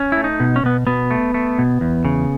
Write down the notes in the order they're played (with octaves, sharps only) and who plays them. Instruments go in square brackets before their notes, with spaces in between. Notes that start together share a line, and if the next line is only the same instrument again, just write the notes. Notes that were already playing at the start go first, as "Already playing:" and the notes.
Already playing: [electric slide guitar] C#4
A3 E4
D#4
B2
C#4
B2 B3
B2 B3
A3
A3
B2
E2
C#3